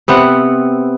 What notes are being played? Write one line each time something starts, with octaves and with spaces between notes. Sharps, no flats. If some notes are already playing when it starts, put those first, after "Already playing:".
C3 B3 C4 F#5